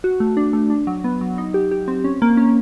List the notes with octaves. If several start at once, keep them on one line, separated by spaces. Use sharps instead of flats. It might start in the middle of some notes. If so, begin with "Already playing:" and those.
F#4
A3
D4
A3
D4
F#3
B3
F#3
D#4
G4
G4
C4
C#4
A#3
C#4